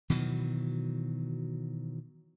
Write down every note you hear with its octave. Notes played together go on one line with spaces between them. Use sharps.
B2 D#3 E3 F#3